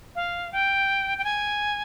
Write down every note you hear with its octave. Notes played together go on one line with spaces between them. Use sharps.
F5
G5
G5
G#5